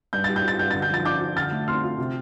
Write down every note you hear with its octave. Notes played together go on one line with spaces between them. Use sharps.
G2 G6
G3 A6
G6
F4 A6
G2 G6
D3 A6
G6
F3 A6
D4 D6 G6
F4
D3 F6 A6
A3
C4 C6 F6
F4
C3